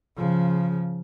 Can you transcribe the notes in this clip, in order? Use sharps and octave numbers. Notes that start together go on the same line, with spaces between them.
C#3 F3